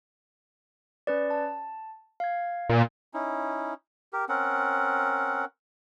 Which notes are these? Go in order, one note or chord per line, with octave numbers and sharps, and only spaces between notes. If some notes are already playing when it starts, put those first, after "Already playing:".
C#4 B4 D5
A5
F5 G#6
A#2
C#4 D#4 E4
G4 A#4
C4 C#4 A#4 F#5